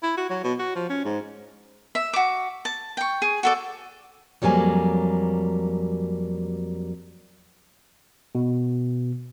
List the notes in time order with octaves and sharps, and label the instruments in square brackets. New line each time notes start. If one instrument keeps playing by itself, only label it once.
[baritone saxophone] E4
F#4
F#3
B2
F#4
F3
C#4
G#2
[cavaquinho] E5
F#4 D6
A5
G5 C#6
G#4
F#4 A4 D5
[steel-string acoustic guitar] F2 F#3 G3 A#3 G#5
[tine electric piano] B2